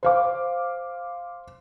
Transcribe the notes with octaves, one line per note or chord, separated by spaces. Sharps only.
C5 F5 D6